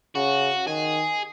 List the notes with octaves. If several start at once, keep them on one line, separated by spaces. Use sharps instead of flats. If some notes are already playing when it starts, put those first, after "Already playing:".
C#3 F#4
D#3 G#4